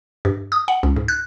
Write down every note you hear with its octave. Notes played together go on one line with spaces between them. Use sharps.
G2
D#6
F#5
C#2
G#2
F#6